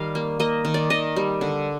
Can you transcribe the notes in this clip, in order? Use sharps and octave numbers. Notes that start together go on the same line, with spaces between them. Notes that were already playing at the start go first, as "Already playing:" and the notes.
Already playing: D#3 G3 F5
A#3
A#3 D#5
D#3
D5
D#3 D#5
G3
D3